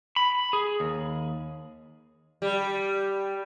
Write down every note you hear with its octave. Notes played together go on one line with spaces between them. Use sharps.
B5
G#4
D#2
G3